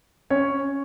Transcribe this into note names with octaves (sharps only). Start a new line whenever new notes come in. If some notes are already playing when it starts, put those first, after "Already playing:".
C#4 C#5